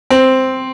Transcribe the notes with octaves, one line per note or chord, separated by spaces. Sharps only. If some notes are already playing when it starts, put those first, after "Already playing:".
C4